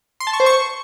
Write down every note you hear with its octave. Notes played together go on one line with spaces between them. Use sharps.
C6
A5
C#6
C5
C#6